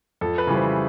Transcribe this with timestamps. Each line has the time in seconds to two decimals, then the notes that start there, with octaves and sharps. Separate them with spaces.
0.21 F2 A4
0.38 B4
0.47 C#3 E3 G3
0.56 C5